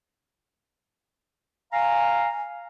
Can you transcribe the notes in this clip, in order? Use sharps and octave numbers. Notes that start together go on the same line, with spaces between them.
F5 G#5 A#5